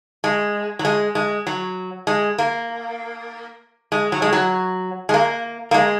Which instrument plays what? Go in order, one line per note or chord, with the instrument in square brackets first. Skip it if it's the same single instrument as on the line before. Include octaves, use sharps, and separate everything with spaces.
[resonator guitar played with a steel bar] G#3
F#3
G#3
G#3
F#3
G#3
A#3
G#3
F#3
G#3
F#3
G#3
A#3
A#3
G#3